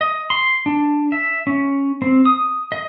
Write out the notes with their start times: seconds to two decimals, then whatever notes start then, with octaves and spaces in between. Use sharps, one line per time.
0.01 D#5
0.30 C6
0.66 D4
1.12 E5
1.47 C#4
2.02 C4
2.25 D#6
2.72 D#5